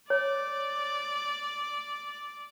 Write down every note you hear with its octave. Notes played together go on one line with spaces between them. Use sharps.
C#5 D5